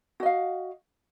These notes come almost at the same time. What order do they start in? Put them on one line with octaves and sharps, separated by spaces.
F#4 D#5 F5